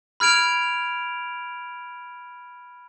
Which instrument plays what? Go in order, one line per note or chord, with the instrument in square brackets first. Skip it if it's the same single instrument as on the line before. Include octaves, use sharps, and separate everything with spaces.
[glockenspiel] B5 F6 G#6 D7 F7